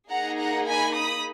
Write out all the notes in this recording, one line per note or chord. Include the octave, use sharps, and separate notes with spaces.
A#3 D#4 G#4 F#5 A#5
F#5 A#5
G#5 B5
B5 D#6